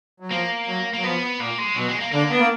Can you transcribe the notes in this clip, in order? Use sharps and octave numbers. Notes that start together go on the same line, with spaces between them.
F#3
F3 A#3
F#3
F#3 A#3
F3 B3
A#2 A#3
G#3
B2 F#3
G#3
A#3
D3 A#3
B3 D4
A#3